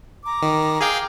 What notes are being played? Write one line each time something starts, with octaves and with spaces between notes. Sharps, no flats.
A#5 D6
D#3
G#4 F5 G5